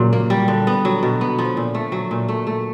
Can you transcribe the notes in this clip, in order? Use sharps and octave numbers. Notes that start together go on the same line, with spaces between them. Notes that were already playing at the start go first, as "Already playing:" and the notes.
Already playing: A#2 C#3 F#3
A#3
G3
D3
B3
F#3
B2
B3
F3
A#2
A3
F#3
A#2
A3
A3